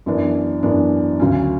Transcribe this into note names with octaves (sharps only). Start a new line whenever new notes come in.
F#2 E3 B3 D4
F#2 E3 B3 D4
D2 C#3 F#3 C#4